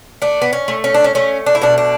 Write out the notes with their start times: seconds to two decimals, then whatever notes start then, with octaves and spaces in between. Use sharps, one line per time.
0.22 A3 D4
0.42 B3
0.53 C#4
0.68 A3
0.84 C#4
0.94 D4
1.04 C#4
1.15 A3 C#4
1.46 D4
1.55 E4
1.62 B2 D4
1.78 D4